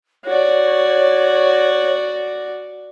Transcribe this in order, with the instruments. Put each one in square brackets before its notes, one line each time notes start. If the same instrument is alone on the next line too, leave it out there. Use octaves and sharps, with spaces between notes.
[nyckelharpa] F#4 D5 [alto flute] C#5